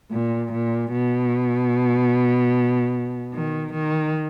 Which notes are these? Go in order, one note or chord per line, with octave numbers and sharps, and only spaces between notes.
A#2
A#2
B2
D#3
D#3